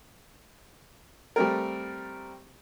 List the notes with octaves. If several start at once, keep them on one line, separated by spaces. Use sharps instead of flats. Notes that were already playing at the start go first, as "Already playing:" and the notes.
G3 A3 C4 A#4